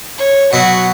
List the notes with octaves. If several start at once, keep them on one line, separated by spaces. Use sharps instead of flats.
C#5
B2 F#3 F#4